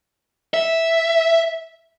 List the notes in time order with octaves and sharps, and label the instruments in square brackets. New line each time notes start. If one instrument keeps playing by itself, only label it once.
[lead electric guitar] E5